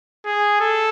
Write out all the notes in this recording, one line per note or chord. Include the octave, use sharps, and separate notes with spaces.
G#4
A4